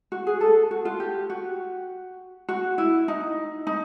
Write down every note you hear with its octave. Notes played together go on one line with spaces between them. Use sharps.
F#4
G#4
A4
F#4
F4
G4
F#4
F#4
E4
D#4
D#4